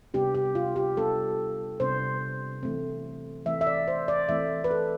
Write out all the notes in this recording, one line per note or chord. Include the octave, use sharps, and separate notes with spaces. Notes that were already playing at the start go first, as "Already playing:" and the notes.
C3 G3 B3 D4 G4
G4
F4
G4
C3 G3 B3 D4 A4
C3 G3 B3 D4 C5
E3 A3 C4
E3 A3 C4 E5
E5
D5
C5
D5
E3 A3 C4 E5
B4
A4